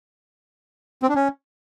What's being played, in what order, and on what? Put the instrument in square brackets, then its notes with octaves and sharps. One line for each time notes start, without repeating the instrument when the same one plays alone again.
[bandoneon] C4
D4
C#4